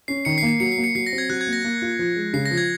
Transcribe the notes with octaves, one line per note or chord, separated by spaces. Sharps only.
C#4 C7
D#3 C#7
C7
A#3
C7
F#3 C#7
C7
A#3
C#7
F#3 C7
A#6
C4
G#6
F#3 F#6
G#6
A#3
A#6
A#3
F4
F3
G#3
C#3 C7
A#6
F3
G#6